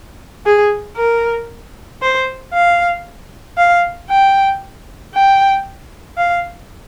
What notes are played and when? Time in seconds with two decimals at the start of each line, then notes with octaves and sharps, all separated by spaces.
0.46 G#4
0.97 A#4
2.02 C5
2.54 F5
3.58 F5
4.10 G5
5.14 G5
6.17 F5